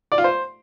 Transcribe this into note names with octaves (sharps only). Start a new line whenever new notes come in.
D5
F4
C5